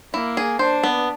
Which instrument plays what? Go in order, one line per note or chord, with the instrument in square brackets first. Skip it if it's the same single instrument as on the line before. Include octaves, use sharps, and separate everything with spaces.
[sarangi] A#3 [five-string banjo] E4
[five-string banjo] G#4
[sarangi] D4 [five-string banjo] C5
[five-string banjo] B3